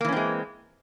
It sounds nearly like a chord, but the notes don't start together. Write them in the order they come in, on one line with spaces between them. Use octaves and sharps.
A#3 E3 C#4 C4 G#3